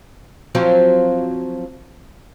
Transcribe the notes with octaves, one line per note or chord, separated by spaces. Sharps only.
F3 F#3 C4